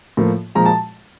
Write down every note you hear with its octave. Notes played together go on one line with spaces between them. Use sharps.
A2 F3 A#3
A#2 F3 G#3 A#5
A5